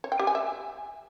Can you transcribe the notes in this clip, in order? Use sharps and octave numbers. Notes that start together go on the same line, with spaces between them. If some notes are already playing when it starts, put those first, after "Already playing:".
C#5
G5
G4
G#5
E5